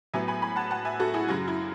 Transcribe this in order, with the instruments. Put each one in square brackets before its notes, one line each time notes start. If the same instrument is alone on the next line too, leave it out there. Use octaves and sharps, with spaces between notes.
[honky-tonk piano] A2 F#3 B3 E5 G#5
G#5 B5
G#5 B5
F#5 A5
F#5 A5
E5 G#5
F#4 A4
E4 G#4
F#2 C#3 F#3 F#4
E4